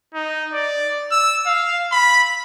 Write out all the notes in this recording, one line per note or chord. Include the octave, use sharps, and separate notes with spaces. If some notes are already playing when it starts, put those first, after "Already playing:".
D#4
D5
E6
F5
B5